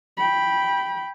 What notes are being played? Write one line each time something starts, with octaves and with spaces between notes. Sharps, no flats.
G5 B5